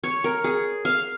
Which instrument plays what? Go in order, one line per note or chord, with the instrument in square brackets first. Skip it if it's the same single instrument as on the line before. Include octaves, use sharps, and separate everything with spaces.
[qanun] C#5
A#4
G#4
F5